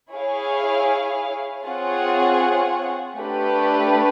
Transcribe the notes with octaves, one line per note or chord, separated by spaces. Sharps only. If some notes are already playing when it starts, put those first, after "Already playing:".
E4 G#4 C#5 F5
C4 F4 G#4 C#5 F#5
A3 D4 G4 B4